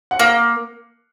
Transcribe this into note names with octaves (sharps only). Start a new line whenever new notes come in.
F#5
A#3 F5